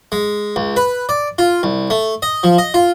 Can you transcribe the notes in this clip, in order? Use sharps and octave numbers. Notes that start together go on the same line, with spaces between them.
G#3
C#2
B4
D5
F4
C2
A3
D#5
F3
D#5
F4